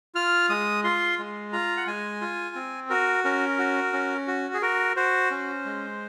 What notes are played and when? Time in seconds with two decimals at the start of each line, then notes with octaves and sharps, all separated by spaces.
0.15 F4 F6
0.49 G#3 D#6
0.84 F4 C6
1.19 G#3
1.53 F4 A#5
1.77 F#5
1.87 G#3 G#5
2.21 F4
2.55 C4
2.90 F#4 A#4
3.24 C#4 A#4
3.59 F#4
3.93 C#4
4.27 F#4
4.54 G#4
4.62 F#4 A#4
4.96 F#4 C5
5.31 C#4
5.65 G#3